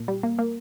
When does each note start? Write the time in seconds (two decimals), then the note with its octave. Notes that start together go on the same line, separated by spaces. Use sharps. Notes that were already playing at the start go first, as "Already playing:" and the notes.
Already playing: A#2
0.08 G3
0.23 A#3
0.39 A#3